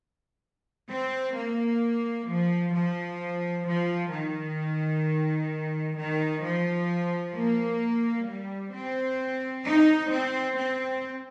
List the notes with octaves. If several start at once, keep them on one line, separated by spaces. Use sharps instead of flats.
C4
A#3
F3
F3
F3
D#3
D#3
F3
A#3
G3
C4
D#4
C4
C4